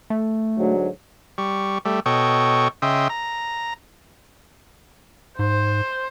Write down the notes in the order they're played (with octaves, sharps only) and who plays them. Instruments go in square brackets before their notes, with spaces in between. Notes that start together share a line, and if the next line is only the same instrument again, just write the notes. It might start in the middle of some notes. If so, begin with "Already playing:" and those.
[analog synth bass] A3
[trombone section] D2 G#2 F#3
[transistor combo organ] G3 C#6
G3 A3
B2 A4 C#5 D#5 G5 C#6
C#3 D#5 E5 G5 C6
A#5
[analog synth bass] G#2 [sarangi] C5